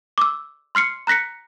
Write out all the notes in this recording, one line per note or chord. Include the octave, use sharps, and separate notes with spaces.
D6 E6
C6 F6 C7 C#7
A#5 F#6 A#6 B6 C#7